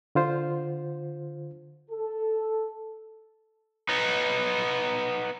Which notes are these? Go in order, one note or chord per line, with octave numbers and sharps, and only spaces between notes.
D3 F4 C5
A4
B3 D#4